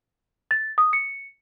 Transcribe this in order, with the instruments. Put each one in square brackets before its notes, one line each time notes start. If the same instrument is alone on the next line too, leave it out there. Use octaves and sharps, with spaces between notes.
[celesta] A6
D#6
C#7